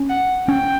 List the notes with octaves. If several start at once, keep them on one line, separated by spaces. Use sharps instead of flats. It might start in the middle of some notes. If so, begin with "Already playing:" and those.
Already playing: C#4
F#5
C#4 G5